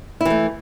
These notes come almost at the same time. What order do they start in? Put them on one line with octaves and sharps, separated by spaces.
E4 E3 A3